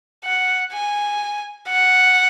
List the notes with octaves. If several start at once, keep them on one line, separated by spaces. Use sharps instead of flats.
F#5
G#5
F#5